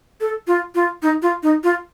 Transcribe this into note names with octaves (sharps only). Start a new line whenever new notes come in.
A4
F4
F4
D#4
F4
D#4
F4